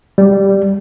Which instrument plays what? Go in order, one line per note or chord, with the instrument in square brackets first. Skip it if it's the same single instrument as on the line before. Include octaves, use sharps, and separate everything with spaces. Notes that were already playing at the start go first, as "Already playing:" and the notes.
[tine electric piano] G3